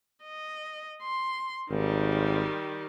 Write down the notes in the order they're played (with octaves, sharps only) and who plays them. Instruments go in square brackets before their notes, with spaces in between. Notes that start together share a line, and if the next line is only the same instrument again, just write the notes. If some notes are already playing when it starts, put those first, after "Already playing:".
[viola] D#5
C6
[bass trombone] G#1 [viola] D#3 G3